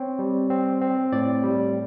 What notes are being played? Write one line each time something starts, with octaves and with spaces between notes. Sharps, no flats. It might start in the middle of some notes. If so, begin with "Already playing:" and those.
Already playing: C4 C#5
G3
C4
C4
A2 D5
G3